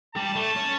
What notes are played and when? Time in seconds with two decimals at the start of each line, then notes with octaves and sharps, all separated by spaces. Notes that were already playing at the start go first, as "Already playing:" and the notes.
0.15 G3 A5
0.36 A3
0.56 C#4